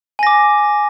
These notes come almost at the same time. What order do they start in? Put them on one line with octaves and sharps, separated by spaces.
G#5 A#6 D6